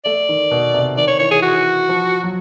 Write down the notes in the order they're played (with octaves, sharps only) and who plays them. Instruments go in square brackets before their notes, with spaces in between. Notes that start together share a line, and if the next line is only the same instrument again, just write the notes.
[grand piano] A3 [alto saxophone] D5
[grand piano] D#3
B2
C3
[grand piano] D#3 [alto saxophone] D5
[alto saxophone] C#5
[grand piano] E3 [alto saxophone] C#5
[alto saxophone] G#4
F#4
[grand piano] F3
F#3